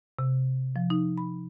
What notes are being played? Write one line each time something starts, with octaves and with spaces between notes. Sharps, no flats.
C3
F3
D#4
B5